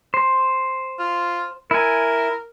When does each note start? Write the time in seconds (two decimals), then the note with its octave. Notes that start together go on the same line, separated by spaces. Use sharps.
0.14 C5
0.99 F4
1.71 E4 A#4 G#5